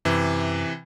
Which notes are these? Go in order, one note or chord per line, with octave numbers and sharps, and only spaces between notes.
F#2 C3 E3